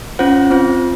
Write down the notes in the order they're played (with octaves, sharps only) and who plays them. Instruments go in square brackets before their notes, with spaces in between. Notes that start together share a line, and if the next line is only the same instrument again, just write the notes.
[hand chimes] C#4 F4 C5 F#5
C4 F4 C5